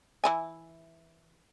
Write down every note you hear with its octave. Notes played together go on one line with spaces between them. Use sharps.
E3 E4 G#5